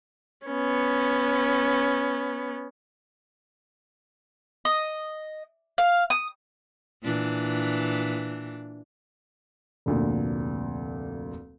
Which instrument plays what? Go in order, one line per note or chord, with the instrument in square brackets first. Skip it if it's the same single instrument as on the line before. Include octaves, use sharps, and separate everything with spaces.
[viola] B3 C#4
[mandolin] D#5
F5
D#6
[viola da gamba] A#2 E3 D4
[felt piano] F1 D2 A#2